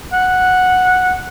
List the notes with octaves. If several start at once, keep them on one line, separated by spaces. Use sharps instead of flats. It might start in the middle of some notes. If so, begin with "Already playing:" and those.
F#5